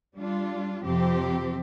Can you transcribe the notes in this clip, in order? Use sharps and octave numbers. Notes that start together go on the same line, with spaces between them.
G3 D4 F4
F2 C3 F3 C4 G4